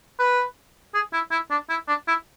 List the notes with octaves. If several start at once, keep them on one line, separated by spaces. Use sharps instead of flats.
B4
G#4
E4
E4
D4
E4
D4
E4